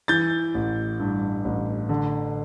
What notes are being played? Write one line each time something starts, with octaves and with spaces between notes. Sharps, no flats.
E3 G6 A6
A1
G2
A1
D3